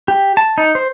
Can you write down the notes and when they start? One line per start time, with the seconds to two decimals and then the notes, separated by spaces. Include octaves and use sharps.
0.08 G4
0.37 A5
0.58 D#4
0.75 C5